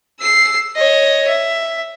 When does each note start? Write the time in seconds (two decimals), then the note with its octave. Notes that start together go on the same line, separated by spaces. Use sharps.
0.20 E6 C7
0.76 C#5 D#5
1.28 E5